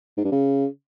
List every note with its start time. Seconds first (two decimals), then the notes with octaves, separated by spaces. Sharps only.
0.17 G#2
0.24 G2
0.32 C#3